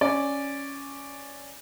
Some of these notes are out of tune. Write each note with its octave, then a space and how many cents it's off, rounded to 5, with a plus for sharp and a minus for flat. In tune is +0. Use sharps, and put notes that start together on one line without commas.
C#4 +0 D5 +0